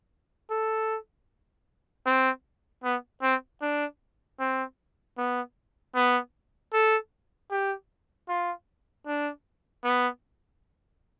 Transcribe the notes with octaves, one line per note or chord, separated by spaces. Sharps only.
A4
C4
B3
C4
D4
C4
B3
B3
A4
G4
F4
D4
B3